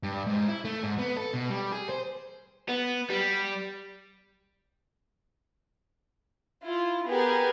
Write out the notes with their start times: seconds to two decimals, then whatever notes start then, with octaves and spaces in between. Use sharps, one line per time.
0.03 G2
0.27 G#2
0.48 E4
0.65 A3
0.83 G#2
0.99 B3
1.17 A4
1.34 B2
1.50 G3
1.72 G#4
1.89 C5
2.69 B3
3.10 G3
6.62 E4 F4
7.08 B3 G4 G#4 A#4 B4